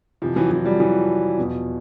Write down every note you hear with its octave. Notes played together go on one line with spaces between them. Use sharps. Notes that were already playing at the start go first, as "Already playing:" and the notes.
F2 C3 E3 F3
E3 F#3
E3 F#3
F3 G3
E3 F#3
E2 B2 F3